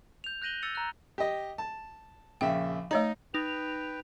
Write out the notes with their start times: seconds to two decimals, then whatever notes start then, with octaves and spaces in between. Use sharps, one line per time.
0.24 G6 F7
0.42 F#6 G6 A#6 D#7 F#7 G7
0.62 E6 A6 C#7 D#7 F7
0.75 A#5 F#6
1.18 G4 D#5
1.58 A5
2.41 A#1 C#3 E5 G5
2.91 A3 D#4 C#5 D#5 A#5
3.34 D#4 B4 G5 F7